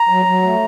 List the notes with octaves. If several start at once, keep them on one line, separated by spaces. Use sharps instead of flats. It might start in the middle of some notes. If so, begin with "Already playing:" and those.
Already playing: A#5
F#3
F#3
A3